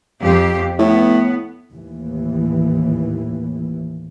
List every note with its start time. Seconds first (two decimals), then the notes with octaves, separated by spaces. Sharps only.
0.22 F2 G4
0.79 A2 B3
1.70 D#2 A2 E3